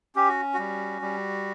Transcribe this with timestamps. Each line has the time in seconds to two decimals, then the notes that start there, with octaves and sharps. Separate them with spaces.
0.15 C#4 G4
0.29 F#4
0.54 G3 F#4
1.02 G3